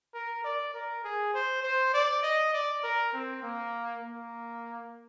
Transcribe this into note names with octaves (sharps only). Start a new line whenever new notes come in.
A#4
D5
A#4
G#4
C5
C5
D5
D#5
D5
A#4
C4
A#3
A#3